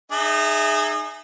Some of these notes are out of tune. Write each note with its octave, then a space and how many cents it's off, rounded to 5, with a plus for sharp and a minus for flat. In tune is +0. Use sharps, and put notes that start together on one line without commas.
D#4 -30 G#4 +0 E5 +0